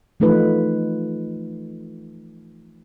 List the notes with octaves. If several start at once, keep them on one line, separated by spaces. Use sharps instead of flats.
E3 F3 A3 D#4 F4 B4